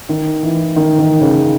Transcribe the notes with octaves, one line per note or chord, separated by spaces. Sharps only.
D#3
E3
D#3
D#3
C#3